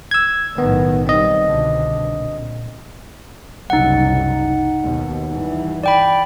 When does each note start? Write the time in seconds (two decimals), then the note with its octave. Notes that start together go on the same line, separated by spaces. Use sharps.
0.11 E6 G#6
0.58 B1 A2 D#3 B3
1.07 D#3 G3 C4 D#5
1.44 C2 B2 D3
2.16 A#2
3.70 F#1 C2 D#4 F#5
4.83 D#2 B2
5.33 G2 E3
5.84 D5 G5 B5